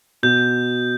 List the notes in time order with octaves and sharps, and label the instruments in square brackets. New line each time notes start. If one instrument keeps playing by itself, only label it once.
[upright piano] B2 [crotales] G6